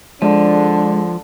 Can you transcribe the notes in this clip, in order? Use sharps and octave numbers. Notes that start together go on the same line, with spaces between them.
D3 F3 G#3 D4